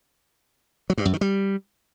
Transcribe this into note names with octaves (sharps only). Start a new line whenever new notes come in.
F#3
G2
F#2
D#3
G3